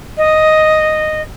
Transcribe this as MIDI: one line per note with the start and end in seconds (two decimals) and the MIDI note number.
0.17 1.21 75